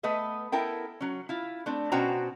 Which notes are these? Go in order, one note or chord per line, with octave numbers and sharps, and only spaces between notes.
A3 B3 B4 D#5 E5
B3 E4 A4 A#4 G5
F#3 C#4
E4 F4
A3 C4 D4
B2 C#4 F#4 C5 G5 A#5